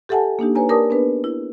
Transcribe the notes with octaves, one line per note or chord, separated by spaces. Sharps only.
G4 A4 E5 F#5 G#5 A5
A#3 D4 D#4 G4
B4 C#5 G#5 A#5
G4 A#4 D5 A5 D6 D#6
B3 D4 G#4 B4
E4